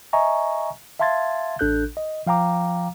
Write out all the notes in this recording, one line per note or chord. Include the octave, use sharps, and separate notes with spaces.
D#5 E5 G#5 A#5 C#6
E5 F5 A5 C6 G#6 A6
A1 D4 A4 F#6 G6
D#5
F3 F5 G5 A#5 D6